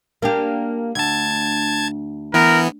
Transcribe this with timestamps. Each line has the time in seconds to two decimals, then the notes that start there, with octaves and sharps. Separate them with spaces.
0.22 A#3 D4 G4
0.95 D2 A5 G#6
2.34 E3 B3 A#4